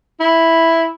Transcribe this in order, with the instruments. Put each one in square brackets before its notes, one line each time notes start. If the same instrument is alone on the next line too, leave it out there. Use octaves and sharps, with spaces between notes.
[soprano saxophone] E4